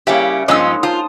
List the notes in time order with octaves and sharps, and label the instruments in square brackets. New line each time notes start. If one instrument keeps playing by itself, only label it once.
[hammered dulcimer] C#3 A#3 [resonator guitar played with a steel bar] G3 C#4 G4 [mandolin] E4
[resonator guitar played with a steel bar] G2 F3 C#4 [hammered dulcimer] G#3 A#3 D#4 [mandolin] D#5 E6
[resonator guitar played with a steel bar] F4 [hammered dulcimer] C5 A5 [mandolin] D#6